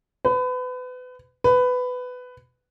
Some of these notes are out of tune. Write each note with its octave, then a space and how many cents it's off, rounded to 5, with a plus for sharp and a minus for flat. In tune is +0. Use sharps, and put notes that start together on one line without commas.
B4 +30
B4 +15